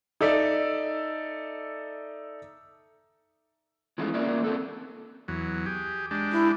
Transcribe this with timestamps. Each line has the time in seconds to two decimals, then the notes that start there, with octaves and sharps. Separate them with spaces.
0.21 D#4 A4 D5 E5
3.98 E3 G#3 A3 B3 C#4 F4
4.14 A#3 C#4 F4 A#4 D5 E5
4.44 C4 D4 A4
5.28 E2 F#3
5.66 G4 G#4
6.11 G#3 D4 G4
6.31 E4